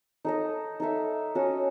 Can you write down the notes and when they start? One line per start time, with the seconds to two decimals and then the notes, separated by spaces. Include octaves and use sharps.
0.25 D#4 A4 D#5
0.80 D#4 A4 E5
1.35 C#4 F#4 A4 D#5